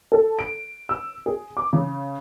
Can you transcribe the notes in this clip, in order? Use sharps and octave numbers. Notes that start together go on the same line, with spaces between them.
A4
D7
E6
G#4
D6
C#3